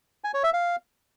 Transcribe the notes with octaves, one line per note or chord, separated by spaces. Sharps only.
G#5
C#5
E5
F5